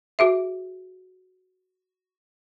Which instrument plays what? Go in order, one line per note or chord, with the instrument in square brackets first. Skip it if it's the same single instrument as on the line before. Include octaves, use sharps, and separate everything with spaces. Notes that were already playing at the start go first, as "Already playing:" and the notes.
[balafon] F#4 G#4 E5